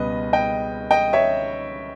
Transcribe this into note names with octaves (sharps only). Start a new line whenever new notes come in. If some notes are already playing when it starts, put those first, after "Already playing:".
Already playing: C#2 B2 G3 B4 D#5
D#5 G5
D#5 G5
C#5 E5